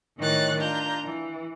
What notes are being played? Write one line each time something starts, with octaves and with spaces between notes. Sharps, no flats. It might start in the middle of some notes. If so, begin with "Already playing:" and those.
A2 D#3 E3 C#5 F#6 A6
D4 F4 A#5 G6
E3